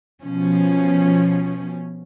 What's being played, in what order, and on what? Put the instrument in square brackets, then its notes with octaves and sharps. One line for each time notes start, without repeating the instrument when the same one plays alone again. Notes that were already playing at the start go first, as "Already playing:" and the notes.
[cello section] B2 F3 C#4